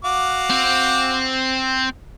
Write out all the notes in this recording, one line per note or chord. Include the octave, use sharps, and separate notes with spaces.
F#4 F5 D6
C4